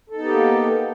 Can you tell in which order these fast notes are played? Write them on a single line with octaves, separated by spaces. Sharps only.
A4 D#4 B3 G4 A#3